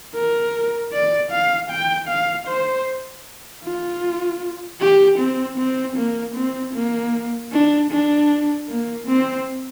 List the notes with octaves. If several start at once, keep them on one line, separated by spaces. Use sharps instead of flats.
A#4
D5
F5
G5
F5
C5
F4
G4
C4
C4
A#3
C4
A#3
D4
D4
A#3
C4